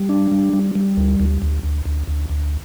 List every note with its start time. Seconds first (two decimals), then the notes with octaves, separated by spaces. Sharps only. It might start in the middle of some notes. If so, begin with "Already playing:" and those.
Already playing: G3
0.09 D4
0.32 G3
0.53 G3
0.75 G3
0.97 D2
1.20 D2
1.42 D2
1.63 D2
1.85 D2
2.07 D2
2.29 D2